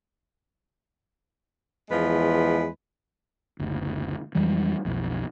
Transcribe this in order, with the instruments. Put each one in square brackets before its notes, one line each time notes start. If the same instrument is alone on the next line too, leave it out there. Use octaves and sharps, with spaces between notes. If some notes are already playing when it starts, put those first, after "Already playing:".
[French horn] E2 [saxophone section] F3 G#3 B4
[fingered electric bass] F#1 D2
F2 E3 G3 G#3
B1 F2